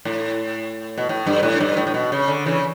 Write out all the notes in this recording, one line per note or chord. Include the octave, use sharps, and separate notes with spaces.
A2
B2
A2
G2
A2
G2
A2
A2
B2
C#3
D3
C#3 E3